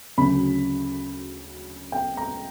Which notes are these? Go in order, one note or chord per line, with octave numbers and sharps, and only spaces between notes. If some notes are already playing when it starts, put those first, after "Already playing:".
D2 C#3 F#3 B5
G5
A#5